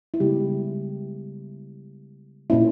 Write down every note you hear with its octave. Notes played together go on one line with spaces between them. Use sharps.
E4
C#3 G3 G#3 B3 G4
A#2 A#3 C#4 E4